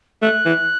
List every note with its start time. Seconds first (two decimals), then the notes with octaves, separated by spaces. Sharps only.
0.22 A3 F#6
0.46 E3